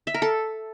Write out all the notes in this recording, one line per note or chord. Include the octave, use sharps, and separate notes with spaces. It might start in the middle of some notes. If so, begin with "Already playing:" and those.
E5
A#4
A4